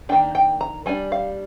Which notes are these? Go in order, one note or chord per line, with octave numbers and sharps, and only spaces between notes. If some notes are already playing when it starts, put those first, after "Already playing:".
D#3 A#3 D4 G5
G5
A#5
G3 D4 G#5
F5